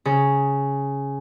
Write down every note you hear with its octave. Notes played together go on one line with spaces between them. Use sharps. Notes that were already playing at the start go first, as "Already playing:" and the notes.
C#3